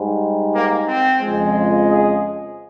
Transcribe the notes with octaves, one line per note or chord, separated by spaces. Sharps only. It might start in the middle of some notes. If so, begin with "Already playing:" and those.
Already playing: G#2 G3
A#3
C4
F2 C#3 F3 G#3
G#4